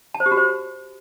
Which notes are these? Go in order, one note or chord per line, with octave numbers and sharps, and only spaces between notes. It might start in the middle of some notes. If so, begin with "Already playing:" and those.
A5
C5
G4
F#4
C5